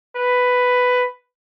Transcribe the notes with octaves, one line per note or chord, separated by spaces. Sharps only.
B4